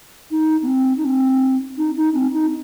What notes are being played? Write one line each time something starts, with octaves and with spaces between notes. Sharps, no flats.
D#4
B3
C4
D#4
C4
D#4
D#4
C4
D#4